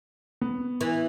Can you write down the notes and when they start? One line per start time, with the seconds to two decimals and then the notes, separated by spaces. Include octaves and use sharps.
0.41 B3
0.81 E3